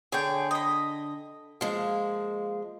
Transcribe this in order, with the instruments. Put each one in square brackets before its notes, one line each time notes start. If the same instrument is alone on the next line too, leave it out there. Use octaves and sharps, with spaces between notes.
[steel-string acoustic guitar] D3 [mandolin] G#4 C#5 G5
[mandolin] D#5 B5
[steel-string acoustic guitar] F3 G#3 [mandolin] A#3